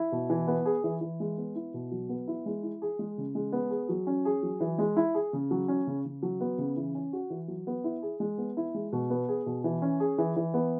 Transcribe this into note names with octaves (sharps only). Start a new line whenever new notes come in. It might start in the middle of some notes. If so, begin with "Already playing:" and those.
Already playing: E4
B2
E3
B3
G#4
E3
E3
G#3
B3
E4
B2
F#3
B3
E4
G#3
E4
G#4
G#3
C#3
G#3
B3
G#4
F#3
C#4
G#4
F#3
E3
G#3
E4
G#4
C#3
F#3
C#4
C#3
C#3
F#3
B3
C#3
E3
C#4
F#4
E3
F#3
B3
E4
G#4
G#3
B3
E4
G#3
B2
B3
G#4
B2
E3
C#4
G#4
E3
E3
B3